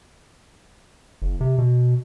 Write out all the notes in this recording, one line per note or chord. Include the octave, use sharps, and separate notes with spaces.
F#1
C3
B2